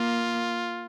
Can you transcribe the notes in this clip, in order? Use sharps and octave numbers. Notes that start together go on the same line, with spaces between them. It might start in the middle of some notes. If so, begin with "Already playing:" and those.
Already playing: A#3 F4